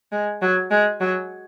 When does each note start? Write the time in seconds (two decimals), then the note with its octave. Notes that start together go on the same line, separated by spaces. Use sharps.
0.12 G#3
0.42 F#3
0.71 G#3
1.00 F#3